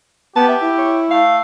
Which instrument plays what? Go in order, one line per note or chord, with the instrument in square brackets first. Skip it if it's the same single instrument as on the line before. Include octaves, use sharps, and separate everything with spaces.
[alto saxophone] B3 [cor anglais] G4 [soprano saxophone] A5
[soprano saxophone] E5
[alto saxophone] E4
[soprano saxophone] C#5
[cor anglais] A3 [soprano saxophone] F5